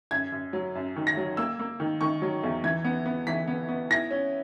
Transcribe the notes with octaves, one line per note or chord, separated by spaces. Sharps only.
F#2 G#6
F#2
F#3
F#2
D#3
A#6
F#3
A#3 E6
A#3
D#3
D#3 C#6
F#3
E2
E3 G#6
B3
B3
E3 B6
B3
B3
E4 A#6
C#4